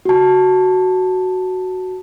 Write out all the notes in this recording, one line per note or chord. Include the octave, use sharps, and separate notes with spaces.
F#4 A5